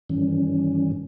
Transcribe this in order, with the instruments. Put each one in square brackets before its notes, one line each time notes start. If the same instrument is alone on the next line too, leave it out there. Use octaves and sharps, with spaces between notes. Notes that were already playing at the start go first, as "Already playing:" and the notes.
[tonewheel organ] G2 D#3 E3 G3 C#4